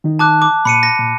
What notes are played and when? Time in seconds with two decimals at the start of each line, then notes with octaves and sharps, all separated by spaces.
0.04 D#3 D#4
0.19 A5 D6 F#6
0.42 D6
0.65 A#2 B5 C#7 D#7
0.83 A#6
0.99 A#2